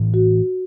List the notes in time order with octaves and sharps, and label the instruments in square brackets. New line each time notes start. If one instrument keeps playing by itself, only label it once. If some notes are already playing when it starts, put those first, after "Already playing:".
Already playing: [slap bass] A2 E3 B3
[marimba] F#4